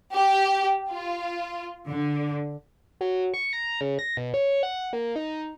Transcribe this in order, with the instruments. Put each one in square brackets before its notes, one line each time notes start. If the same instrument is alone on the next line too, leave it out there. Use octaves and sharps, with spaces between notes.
[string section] G4
F4
D3
[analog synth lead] F#3
C#6
A#5
C#3
A#6
B2
C#5
F#5
A#3
D#4